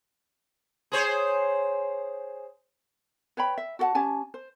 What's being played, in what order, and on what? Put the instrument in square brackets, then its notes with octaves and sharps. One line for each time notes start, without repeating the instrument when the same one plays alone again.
[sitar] G#4 C5 C#5
[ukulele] B4 C#5 G5 B5
E5
F#4 A4 F#5 A5
C#4 G4 G#5 A5
C5